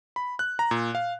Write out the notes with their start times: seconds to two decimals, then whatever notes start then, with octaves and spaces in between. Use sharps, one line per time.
0.16 B5
0.39 F#6
0.59 A#5
0.71 A#2
0.95 F5